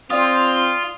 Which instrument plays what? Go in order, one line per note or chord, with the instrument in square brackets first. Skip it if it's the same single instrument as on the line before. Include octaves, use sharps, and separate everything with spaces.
[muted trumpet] C4 [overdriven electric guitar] F4 [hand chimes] D5 F5 D#6